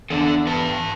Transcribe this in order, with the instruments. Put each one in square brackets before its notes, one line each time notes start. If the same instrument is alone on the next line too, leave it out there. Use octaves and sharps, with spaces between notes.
[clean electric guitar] E2 [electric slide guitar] D4 A4
[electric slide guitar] B4 A5